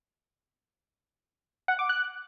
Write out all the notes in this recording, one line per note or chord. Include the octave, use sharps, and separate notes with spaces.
F#5
D6
F#6